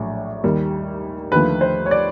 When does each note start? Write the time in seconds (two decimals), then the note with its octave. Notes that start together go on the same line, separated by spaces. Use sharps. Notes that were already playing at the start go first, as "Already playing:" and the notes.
Already playing: A#1 A2 F#3
0.44 D#2 D#3 G3
1.32 D#2 D3 F3 A3 B4
1.61 C5
1.86 C#5
1.91 D5